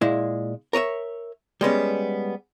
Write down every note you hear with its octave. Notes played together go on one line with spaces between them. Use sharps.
A#2 G#3 E4
A#4 C#5 D#5 E5
G3 G#3 B3 C#4